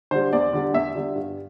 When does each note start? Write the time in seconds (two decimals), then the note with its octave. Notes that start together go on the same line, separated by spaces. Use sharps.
0.11 D3 G3 C5
0.33 E2 D5
0.53 D3 G3
0.74 E2 E5
0.95 D3 G3
1.16 G2